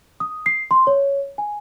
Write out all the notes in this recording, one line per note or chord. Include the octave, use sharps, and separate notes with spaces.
D#6
C7
C6
C#5
G#5